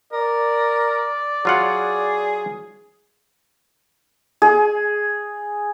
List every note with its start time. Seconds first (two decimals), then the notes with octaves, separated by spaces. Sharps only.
0.13 A#4 D5
1.45 F#3 F4 G#4 F#5
4.42 G#4